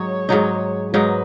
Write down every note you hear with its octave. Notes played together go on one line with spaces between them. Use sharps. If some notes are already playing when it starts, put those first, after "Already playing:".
Already playing: G#2 F#3 D#4 C#5
G#2 F#3 D#4
G#2 F#3 D#4 B4